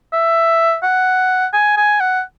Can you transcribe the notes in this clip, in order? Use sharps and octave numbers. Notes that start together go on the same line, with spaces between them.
E5
F#5
G#5
G#5
F#5